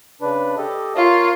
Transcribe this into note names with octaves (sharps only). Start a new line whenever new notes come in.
C#3 D4 B4
G4 A4 D#5
F4 A#4 C#5 F5